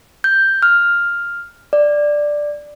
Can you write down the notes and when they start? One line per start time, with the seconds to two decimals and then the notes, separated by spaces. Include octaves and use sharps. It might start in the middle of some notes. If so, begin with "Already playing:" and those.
0.24 G6
0.62 F6
1.73 D5